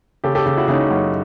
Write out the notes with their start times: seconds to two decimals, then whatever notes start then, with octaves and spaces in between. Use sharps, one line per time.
0.24 C#3 G4 A4
0.35 G4 A4
0.46 C#3
0.57 E4 F#4
0.68 C#3 C#4 D#4
0.90 F#2